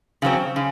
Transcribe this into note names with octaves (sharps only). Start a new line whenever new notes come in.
C#3 F#3 C4
C#3